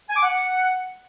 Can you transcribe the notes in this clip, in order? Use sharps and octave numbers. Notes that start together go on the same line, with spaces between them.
G#5
D6
F#5